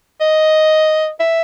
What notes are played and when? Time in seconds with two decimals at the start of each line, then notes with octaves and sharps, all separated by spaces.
0.21 D#5
1.20 E5